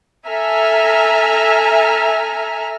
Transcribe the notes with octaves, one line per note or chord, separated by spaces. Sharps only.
A4 E5 G#5 A#5 F6